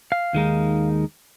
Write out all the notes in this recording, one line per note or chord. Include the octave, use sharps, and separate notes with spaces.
F5
D#2 D#3 G#3 D#4